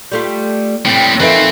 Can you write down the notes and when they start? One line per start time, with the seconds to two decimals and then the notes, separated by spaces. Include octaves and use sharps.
0.12 G3 A3 F4
0.85 A2 G3 C4
1.20 A#2 F3 A3 C4 D#4 B4